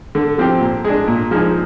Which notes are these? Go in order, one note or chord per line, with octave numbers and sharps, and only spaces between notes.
D3
F3 C4 G4
A#2
G#3 D4
A#2
F3 G#3 D#4